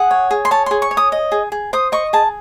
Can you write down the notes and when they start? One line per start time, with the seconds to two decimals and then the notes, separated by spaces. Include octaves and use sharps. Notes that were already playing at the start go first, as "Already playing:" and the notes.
Already playing: G#4 F#5
0.11 C#5
0.31 G#4
0.45 C6
0.51 C#5 A5
0.66 G#4 C6
0.82 C#6
0.91 C#5
0.97 D#6
1.12 D#5
1.32 G#4
1.52 G#4
1.73 C5 D#6
1.92 D#5 C#6
2.13 G#4 A5